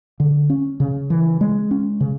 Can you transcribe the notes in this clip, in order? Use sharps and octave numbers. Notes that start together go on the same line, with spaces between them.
D3
C#4
C#3
E3
G#3
C#4
C#3